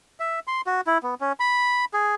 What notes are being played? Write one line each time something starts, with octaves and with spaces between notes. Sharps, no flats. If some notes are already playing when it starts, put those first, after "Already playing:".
E5
C6
F#4
E4
B3
C#4
B5
G#4